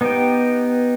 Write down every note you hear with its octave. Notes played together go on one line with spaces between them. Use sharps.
B3 D#4 G4